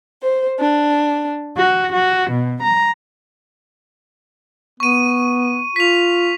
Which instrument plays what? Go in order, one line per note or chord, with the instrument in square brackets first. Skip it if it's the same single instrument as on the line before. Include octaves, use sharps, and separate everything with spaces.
[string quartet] C5
D4
F#4
F#4
B2
A#5
[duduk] B3 [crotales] C#6 D#7
[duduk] F4 [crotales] B6 F7